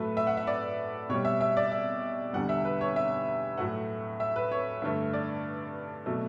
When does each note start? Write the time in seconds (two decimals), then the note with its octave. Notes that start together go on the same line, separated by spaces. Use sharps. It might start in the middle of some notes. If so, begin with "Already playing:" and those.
Already playing: A2 F#3 A3 B4
0.17 E5
0.27 F#5
0.37 E5
0.47 D5
1.09 B2 G3 C#5
1.25 E5
1.41 E5
1.57 D5
1.72 E5
2.33 E2 D3 G3 F#5
2.49 E5
2.65 B4
2.81 C#5
2.96 E5
3.57 A2 F#3 A3 F#5
4.20 E5
4.36 B4
4.52 C#5
4.82 G2 D3 A3
5.13 D5
6.06 B2 F#3 A3